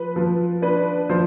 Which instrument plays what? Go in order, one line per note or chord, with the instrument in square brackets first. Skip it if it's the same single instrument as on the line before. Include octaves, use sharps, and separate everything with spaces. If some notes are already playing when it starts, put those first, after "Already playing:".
Already playing: [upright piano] F3 [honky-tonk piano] B4
[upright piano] F3
[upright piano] D4 [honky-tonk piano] B4
[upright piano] F3 [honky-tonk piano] C5